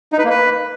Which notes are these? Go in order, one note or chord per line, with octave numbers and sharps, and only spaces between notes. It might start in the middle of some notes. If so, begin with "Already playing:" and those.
D#4
B4
A#3
B4